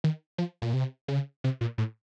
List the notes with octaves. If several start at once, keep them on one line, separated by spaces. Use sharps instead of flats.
D#3
F3
A#2
C3
C#3
C3
A#2
A2